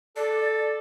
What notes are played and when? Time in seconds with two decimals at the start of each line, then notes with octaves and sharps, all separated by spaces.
0.16 A4 D5